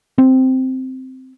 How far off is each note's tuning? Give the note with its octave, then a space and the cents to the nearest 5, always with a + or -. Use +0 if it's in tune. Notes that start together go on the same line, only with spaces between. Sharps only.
C4 -5